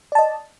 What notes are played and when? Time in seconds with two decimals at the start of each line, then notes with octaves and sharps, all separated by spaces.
0.12 D5
0.15 A5
0.19 D#5